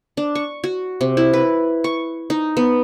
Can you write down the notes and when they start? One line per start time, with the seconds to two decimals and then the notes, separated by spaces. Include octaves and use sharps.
0.17 D4
0.35 C#6
0.64 F#4
1.01 C3
1.17 E4
1.33 B4
1.84 C#6
2.30 D#4
2.57 B3